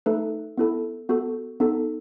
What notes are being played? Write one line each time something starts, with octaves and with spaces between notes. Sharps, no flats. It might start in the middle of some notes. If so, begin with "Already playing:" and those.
A3 D#4 A4 B4
B3 E4 A4
B3 F#4 A4
B3 D#4 A4